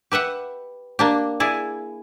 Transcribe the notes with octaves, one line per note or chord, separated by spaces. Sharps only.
G4 B4 E5 F#5
A#3 D4 G4
E4 G#4 D5